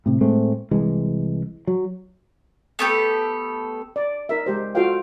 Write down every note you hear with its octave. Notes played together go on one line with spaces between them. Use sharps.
A2 C3
A2 G#3 A3 C4
C2 E3 G#3
F#3
A3 B3 G4 A4
D5
D#4 A#4 E5
G#3 G4 C5
F4 F#4 A4 C5 F5 G5